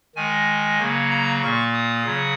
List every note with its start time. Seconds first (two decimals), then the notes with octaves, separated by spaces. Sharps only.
0.16 D#3 G#3 G#5
0.79 C#3 F#3 A#3
1.11 A#5
1.42 A#2 A#3 C#6
1.74 D#6
2.06 C#3 F#3